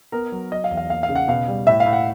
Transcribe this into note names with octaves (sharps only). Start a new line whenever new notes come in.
B3 A#4
F#3
F#3 D#5
F5
E2
F5
A#3 F5
F5
C#3
F#5
B2 F5
G3
A2 E5
F5
A2
F#5